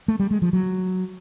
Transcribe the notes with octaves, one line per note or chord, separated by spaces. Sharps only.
A3
G3
G#3
F3
F#3